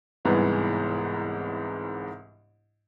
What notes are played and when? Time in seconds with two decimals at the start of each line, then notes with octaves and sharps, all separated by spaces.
0.25 G1 C2 G#2 E3 G#3 B3